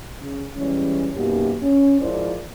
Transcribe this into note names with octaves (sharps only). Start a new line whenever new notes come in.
C#3
E3 G3 G#3 C#4
F#2 B2 A#3 D#4 G4
C#4
G#2 F3 E4 A#4 C5 D5